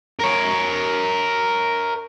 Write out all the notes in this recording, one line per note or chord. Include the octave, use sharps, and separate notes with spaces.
A#4 C#5